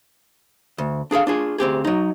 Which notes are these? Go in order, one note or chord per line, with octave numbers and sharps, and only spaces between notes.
D2
D4 G#4 A4 F5
D4 F4 G#4
D2 C4 G4 G#4
F#3 D#4